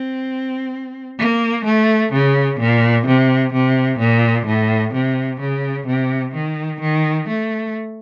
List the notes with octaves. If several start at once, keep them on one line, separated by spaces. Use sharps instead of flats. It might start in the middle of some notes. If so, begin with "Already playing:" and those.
Already playing: C4
A#3
A3
C#3
A#2
C3
C3
A#2
A2
C3
C#3
C3
D#3
D#3
A3